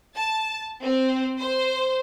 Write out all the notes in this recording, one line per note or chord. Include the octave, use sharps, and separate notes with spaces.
A5
C4
C5